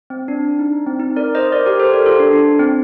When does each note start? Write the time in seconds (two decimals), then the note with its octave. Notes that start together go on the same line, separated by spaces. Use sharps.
0.10 C4
0.28 D4
0.45 D4
0.59 D#4
0.87 C4
1.00 D#4
1.16 A#4 D5
1.35 C5 D#5
1.52 A#4 D5
1.66 G4 A#4
1.80 A4 C5
1.92 G4 A#4
2.06 F4 A4
2.20 D4
2.33 D4
2.59 C4